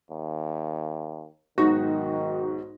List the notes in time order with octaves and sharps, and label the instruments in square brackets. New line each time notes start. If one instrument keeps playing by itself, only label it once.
[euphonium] D#2
[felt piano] B1 G#2 A#6 [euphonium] D#3 [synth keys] D#4 F#4